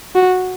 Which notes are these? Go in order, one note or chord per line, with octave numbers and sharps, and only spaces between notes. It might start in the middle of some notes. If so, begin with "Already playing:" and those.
F#4